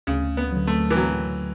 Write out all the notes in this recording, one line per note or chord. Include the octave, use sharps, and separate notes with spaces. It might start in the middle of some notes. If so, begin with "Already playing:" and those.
D2 C#3
B3
D3 F#3
A3
E3
D2 F#3